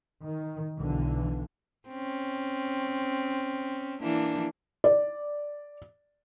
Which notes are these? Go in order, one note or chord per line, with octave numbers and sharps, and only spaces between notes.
D#3
B1 D3 E3
C4 C#4
E3 A#3 D4
D5